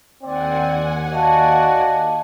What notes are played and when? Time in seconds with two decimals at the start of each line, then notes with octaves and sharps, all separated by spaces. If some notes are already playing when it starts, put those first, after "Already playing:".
0.23 D#2 C4 D5 F#5 G#5
1.12 F#4 D5 D#5 F5 A5